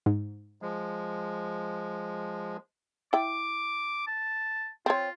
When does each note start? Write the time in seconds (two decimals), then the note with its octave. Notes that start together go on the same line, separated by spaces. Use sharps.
0.06 G#2
0.62 F3 G#3
3.13 E4 G5 D6
4.07 A5
4.86 C4 F4 C#5